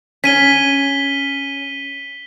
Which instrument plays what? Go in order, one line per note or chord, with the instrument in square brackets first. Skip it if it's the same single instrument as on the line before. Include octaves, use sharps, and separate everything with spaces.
[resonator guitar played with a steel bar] C#4 [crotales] B6 D#7 G7